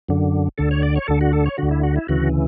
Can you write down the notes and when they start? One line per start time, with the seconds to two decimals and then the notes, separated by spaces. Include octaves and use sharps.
0.09 F#2 D3
0.58 D2 D3 A4
0.71 C#5
0.83 D5
0.96 C#5
1.08 D2 D3 A4
1.21 F#4
1.33 A4
1.46 C#5
1.58 D2 D3 F#4
1.71 E4
1.83 F#4
1.96 E4
2.08 D2 C#3 E3 F#4